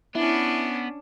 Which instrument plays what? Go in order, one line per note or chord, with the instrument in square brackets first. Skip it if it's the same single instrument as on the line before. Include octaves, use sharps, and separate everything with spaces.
[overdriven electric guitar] B3 [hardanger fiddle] C#4 D4 [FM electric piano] E4